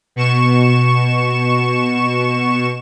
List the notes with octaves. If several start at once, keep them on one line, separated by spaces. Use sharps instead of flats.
B2 C#6 E7